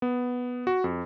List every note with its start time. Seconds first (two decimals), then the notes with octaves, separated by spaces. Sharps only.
0.02 B3
0.67 F#4
0.84 F2